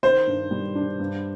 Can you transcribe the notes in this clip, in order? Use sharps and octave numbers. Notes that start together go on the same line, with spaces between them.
D#3 C5
G2
G3
D4
G2